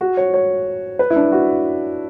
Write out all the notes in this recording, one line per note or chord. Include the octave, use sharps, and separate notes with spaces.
F#4
C#5
C#5
B4
E4
D4
F#4